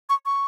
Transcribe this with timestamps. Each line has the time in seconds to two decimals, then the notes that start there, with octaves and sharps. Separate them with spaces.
0.09 C#6
0.26 C#6